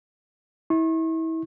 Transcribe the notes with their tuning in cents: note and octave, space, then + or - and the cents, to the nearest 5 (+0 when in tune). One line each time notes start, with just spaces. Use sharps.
E4 -30 C#6 -40